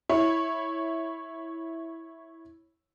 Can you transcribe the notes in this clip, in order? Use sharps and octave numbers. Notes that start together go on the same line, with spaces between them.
E4 C#5